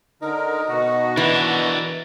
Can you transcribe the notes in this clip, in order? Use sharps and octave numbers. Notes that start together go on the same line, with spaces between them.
D3 D#4 A#4
B2 F#4
E3 D4 A#4